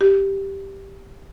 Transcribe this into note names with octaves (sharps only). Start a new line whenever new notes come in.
G4